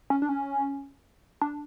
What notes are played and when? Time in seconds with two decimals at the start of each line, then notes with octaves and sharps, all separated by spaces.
0.10 C#4
0.22 D4
0.29 C#4
1.42 D4